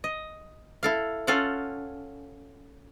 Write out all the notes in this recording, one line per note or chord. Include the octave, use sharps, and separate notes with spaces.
D#5
E4 A4 F5
C#4 F4 A4 F5 F#5